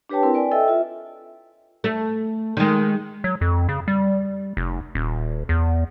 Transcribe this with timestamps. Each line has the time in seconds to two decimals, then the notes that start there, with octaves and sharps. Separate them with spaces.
0.09 D4 G4 B4 C#5 G5 A5
0.23 C4 E4 A#4
0.34 B4 D5 G5 G#5
0.51 A4 D#5 E5 G5 E6
0.68 F4 E5
1.84 A3
2.57 D#3 G#3
3.24 F#3
3.41 F2
3.69 C#3
3.88 G3
4.57 F1
4.95 D#1
5.49 E2